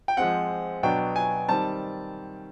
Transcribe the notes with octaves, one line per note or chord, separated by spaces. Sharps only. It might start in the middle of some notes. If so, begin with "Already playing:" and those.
G5
F3 G#3 C4 F#5
B2 F#3 B3 D4 G5
G#5
D#3 G3 C4 A5